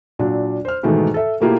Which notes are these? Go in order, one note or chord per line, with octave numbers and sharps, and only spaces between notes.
A#2 F#3 D4
C5 F6
G#2 B2 D#3 E3 A3
A4 E5
B2 A3 A#3 E4 F4 G4